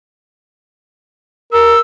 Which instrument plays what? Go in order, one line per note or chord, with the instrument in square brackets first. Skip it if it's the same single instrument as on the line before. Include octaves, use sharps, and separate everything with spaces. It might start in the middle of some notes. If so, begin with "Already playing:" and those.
[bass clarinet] A#4 [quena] E6